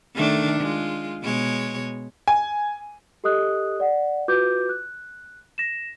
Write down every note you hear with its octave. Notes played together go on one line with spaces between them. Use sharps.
D#3 A3 D4
G#3 F4
B2 G#3 C#5
G#5
G4 A4 D#5 D#6 F#6
D5 F#5
F4 F#4 B4 D6 G6
F#6
A#6 E7